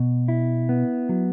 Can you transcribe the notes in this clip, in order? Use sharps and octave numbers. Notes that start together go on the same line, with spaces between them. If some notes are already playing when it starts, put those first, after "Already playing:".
Already playing: B2
E4
B3
F#3